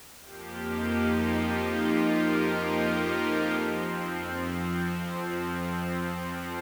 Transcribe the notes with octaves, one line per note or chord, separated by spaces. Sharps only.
F2 F3 A#3 G4
D#4
F4
F4
A#4
F4
D#4
F2 F3 C4